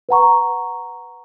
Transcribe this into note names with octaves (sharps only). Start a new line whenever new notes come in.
B4 F#5 A#5 C#6